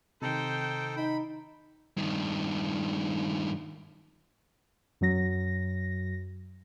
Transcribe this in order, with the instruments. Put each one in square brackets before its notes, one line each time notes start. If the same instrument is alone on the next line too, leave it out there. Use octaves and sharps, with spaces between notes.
[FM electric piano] C3 D#3 [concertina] D#4 A4 [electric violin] C5 G5
[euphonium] D#4 [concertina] B5
[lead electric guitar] G2 D#3
[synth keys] F#2 F#3 A#6